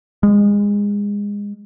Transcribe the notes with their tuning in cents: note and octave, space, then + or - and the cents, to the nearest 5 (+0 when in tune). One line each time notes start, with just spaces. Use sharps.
G#3 -25